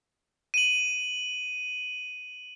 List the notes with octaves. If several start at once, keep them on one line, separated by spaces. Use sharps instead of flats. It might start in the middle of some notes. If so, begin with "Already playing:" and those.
D#7 F#7